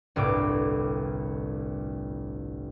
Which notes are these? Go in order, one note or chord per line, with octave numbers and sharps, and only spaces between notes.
G1 C2 A2 D6